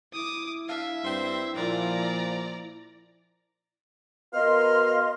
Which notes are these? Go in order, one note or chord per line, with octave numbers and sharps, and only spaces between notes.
E4 D6 D#6
D4 E5 F5
G2 C4 C5
A#2 F3 D5 A#5
B3 F#4 A#4 D#5 F5 C6